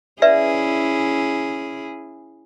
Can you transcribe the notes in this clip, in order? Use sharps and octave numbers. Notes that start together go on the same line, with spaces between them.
C#4 E4 G#4 B4 D5 E5